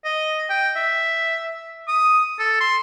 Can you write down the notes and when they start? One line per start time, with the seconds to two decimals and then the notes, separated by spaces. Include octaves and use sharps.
0.05 D#5
0.50 G5
0.76 E5
1.88 D#6
2.39 A4
2.60 C6